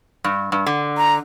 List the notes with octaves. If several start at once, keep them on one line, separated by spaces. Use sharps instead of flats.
G2
G2
D3
A#5